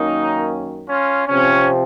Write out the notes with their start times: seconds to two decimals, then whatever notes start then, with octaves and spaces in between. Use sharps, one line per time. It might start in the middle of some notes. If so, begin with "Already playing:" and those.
Already playing: F#2 D#3 A#3 C#4 D#4
0.88 C#4 F4
1.27 C3 F3 C4 C#4